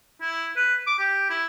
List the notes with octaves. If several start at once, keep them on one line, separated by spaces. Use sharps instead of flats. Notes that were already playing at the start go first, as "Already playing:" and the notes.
E4
B4
D6
G4
E4